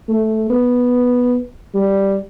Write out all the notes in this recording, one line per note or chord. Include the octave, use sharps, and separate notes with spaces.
A3
B3
G3